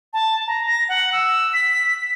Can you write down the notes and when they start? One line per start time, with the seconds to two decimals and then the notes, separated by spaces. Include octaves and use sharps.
0.13 A5
0.47 A#5
0.68 A#6
0.89 F#5
1.13 E6
1.53 B6